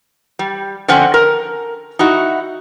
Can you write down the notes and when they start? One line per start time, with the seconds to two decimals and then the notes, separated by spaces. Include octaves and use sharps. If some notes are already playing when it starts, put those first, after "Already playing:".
0.39 G3
0.88 D3 F3 C4 C#4 F#5
1.14 A#4
1.99 D#4 E4 F#4